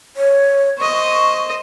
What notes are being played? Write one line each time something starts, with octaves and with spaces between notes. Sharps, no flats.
C#5
C5 D#5 C#6